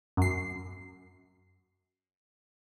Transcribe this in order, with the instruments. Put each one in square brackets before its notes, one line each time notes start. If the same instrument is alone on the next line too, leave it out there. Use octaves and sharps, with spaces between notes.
[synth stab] F#2 C7